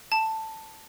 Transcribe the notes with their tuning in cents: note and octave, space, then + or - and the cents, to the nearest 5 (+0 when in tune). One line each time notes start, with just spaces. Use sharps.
A5 +10